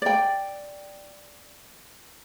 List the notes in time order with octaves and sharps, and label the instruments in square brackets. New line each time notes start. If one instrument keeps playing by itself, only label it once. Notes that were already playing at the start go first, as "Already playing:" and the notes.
[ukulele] D5 G5